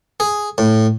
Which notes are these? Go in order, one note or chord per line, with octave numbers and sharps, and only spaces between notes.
G#4
A2